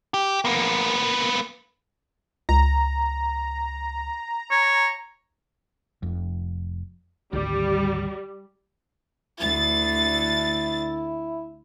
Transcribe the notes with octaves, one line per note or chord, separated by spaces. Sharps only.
G4
A#3 B3
C#2 A#5
C#5
F1 F2
G#1 D2 G3
D2 E4 A6